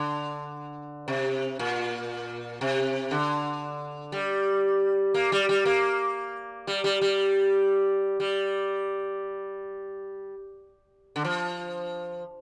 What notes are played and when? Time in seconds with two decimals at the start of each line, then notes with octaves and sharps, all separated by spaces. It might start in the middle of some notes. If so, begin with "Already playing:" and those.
Already playing: D3
1.08 C3
1.59 A#2
2.61 C3
3.11 D3
4.12 G3
5.14 A#3
5.32 G3
5.49 G3
5.65 A#3
6.67 G3
6.84 G3
7.01 G3
8.20 G3
11.16 D3
11.25 F3